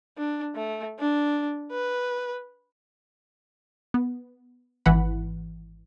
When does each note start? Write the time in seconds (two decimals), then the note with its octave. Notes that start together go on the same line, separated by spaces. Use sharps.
0.17 D4
0.55 A3
0.99 D4
1.71 B4
3.94 B3
4.86 G#1 E3 F#5 B5